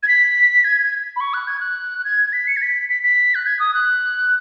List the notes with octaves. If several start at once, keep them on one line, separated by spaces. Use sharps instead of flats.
G#6
B6
G#6
B5
C#6
F#6
G#6
F#6
F#6
G#6
B6
C#7
G#6
B6
B6
B6
F#6
G#6
D#6
F#6